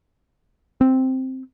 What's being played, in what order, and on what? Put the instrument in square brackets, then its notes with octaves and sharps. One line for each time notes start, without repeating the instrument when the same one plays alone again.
[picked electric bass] C4